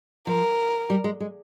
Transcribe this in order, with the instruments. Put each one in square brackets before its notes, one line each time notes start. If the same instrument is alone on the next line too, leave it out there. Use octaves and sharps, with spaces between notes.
[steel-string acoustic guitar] F3 [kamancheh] A#4
[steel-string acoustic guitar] G3
G#3
G#3